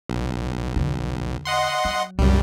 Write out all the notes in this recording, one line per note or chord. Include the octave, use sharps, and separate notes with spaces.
B1
E2 D3
D#5 F#5 C6
F#3
C2 F#2 G3